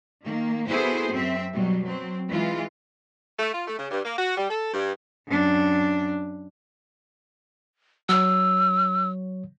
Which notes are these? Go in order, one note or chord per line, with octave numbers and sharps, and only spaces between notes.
D#3 A#3
B3 E4 F#4 G#4 A4 C5
F#2 C4 E5
B2 F#3 G3
F#3 C4
E3 G#3 F4
A3
F4
A3
C#3
G2
A#3
F#4
G3
A4
G2
F#2 D4
F#3 C#5 E6